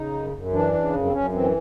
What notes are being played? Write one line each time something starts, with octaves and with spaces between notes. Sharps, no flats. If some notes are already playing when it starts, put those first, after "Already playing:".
Already playing: C#3 D#4
F#2
F#2
E3 D4
C#3
F#2
C4
F#2 C#4
E3 C4